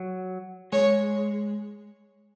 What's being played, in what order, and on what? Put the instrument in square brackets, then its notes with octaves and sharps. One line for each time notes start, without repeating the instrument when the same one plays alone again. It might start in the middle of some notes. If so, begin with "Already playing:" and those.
Already playing: [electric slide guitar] F#3
[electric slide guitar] G#3 [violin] C#5